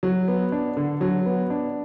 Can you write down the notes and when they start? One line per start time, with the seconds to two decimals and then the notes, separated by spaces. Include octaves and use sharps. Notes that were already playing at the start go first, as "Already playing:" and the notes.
0.03 F#3
0.28 B3
0.52 D4
0.77 D3
1.01 F#3
1.26 B3
1.50 D4